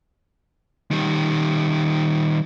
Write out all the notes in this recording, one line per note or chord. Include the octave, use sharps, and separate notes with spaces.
D#3 G3